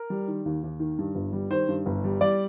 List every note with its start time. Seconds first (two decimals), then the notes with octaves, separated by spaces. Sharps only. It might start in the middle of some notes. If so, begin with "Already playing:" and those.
Already playing: A#4
0.10 G3
0.28 D#3
0.46 D#2
0.63 D#2
0.80 D#3
0.99 G2
1.15 G1
1.33 G3
1.50 D#3 C5
1.69 G2
1.86 G1
2.04 G3
2.21 G3 D5